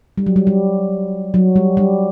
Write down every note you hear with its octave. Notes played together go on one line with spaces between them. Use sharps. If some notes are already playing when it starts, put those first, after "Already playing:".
G3
F#3
G3
G3
F#3
G3
G3